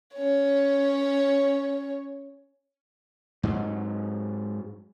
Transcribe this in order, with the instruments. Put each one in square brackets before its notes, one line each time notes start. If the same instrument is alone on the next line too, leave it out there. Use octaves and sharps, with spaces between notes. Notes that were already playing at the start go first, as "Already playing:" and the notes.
[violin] C#4 C#5
[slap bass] G#2 F#3